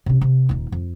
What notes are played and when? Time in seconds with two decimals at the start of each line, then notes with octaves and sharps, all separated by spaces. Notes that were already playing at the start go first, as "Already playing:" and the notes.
0.06 C3 C#4
0.21 C3
0.49 D#1 D#4
0.72 F2